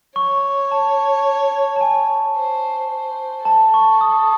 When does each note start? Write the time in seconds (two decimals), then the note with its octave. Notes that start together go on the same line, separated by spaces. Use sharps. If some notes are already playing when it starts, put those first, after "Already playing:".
0.16 C#5 C#6
0.71 A5
1.76 A5
1.81 G#5
2.36 C5
2.91 C5
3.45 A4 A5
3.74 C#6
4.01 D#6